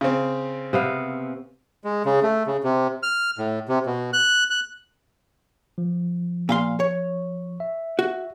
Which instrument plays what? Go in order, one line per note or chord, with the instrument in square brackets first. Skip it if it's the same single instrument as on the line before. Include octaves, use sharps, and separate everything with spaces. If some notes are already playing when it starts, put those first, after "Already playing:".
[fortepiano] C#3 C4
[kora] C3 B3 F5
[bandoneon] G#3
C#3
A3
C#3
C3
F6
A2
C3
B2
F#6
F#6
[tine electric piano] F3
[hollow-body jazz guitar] A#2 F5 C6
C#5
[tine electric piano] E5
[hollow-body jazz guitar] F#4